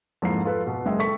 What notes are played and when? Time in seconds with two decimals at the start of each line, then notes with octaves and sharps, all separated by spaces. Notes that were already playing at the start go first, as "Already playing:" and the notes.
0.22 F2 G#2 A#3 E4 C7
0.45 F4 A4 B4
0.67 B2
0.85 F#1 G#3 E5 G5
0.99 A4 E5 C#6 B6